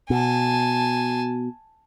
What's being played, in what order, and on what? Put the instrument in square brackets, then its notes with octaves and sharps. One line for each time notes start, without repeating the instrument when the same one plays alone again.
[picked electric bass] B2 [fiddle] G#5 A5